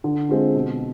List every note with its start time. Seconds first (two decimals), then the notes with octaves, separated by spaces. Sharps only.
0.04 D3
0.29 G#3 C4 F4
0.54 B2